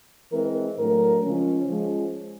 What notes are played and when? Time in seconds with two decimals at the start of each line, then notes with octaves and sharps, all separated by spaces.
0.32 E3 G#3 C4 A#4
0.78 A2 F#3 A3 D4 A#4
1.23 C#3 F3 G#3 C#4
1.69 F3 G#3 C#4